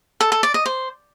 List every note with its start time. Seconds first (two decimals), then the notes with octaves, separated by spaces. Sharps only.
0.20 A4
0.32 A4
0.43 D5
0.54 D#5
0.66 C5